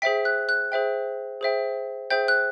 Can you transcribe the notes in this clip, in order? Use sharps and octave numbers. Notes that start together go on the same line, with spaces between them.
G#4 C5 E5 G5 B6
F#6
F#6
G#4 C5 E5 G5
G#4 C5 E5 G5
G#4 C5 E5 G5 G6
F#6